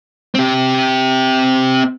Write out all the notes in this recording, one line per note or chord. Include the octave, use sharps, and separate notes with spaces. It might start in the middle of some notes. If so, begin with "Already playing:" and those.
C4 G4